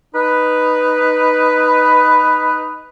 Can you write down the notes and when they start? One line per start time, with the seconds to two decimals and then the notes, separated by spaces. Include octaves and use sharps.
0.14 D#4 B4